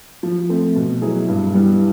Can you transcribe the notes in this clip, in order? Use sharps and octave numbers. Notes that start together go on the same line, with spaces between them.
F3
A3 C4
B2
F#3 B3 E4 G#4
G2
E3 G3 B3